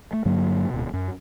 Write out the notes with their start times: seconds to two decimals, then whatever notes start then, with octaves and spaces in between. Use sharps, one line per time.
0.13 A3
0.25 G2 D3 F#3 A#3
0.70 D1 B2
0.93 F#2